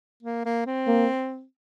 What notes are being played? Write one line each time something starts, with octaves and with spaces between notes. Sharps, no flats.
A#3
A#3
C4
A#3